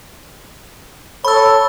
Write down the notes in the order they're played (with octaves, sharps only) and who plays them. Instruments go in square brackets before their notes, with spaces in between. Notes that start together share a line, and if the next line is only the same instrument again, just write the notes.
[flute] A4 [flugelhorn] C#5 [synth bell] B5 E6